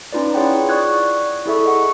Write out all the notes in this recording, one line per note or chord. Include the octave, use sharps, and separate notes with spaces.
C#4 D#4 F4 B4 D5
E4 F4 G#4 C#5 F#5 G5
D5 C#6 D#6 F#6 G#6
E4 G#4 A4 E5 C#6
D#5 F#5 C#6